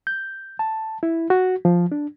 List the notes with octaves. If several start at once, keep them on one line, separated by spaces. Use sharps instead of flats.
G6
A5
E4
F#4
F3
D4